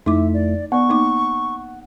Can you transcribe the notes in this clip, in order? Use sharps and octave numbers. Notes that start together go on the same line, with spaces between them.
F2 A3 D#4 E4 E5 D6
D5
B3 D5 F#5 C#6
A#3 D#4 D6